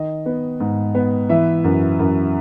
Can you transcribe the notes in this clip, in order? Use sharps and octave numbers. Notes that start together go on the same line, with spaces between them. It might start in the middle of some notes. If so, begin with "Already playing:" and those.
Already playing: D#3 D#5
B3
G#2
B3
E3 E5
F#2
F#2